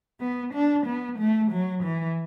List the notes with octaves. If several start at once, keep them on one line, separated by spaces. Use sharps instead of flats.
B3
D4
B3
A3
F#3
E3